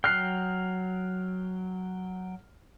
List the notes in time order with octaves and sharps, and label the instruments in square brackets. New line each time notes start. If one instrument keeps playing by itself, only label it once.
[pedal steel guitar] F#3 G5 [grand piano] F6 F#6 C7